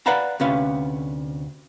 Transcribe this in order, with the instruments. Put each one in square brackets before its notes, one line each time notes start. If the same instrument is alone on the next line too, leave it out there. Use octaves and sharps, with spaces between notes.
[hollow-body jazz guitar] B4 D5 F5 F#5 A#5 B5
D2 C3 C#4 B4 F5